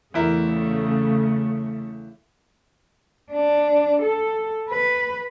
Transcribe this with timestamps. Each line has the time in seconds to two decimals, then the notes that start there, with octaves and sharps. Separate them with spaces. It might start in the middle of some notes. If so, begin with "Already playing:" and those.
0.14 E2 C#3 A3 E4 A#4
3.32 D4
4.03 A4
4.69 B4